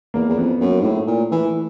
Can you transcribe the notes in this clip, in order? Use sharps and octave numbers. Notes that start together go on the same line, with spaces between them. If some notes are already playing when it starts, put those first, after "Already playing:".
E2 A#3
E2
F2 B3
F#2 A#3
G#2
A2
A3
A#2
E3